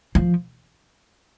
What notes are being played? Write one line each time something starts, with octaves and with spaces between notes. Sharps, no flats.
F3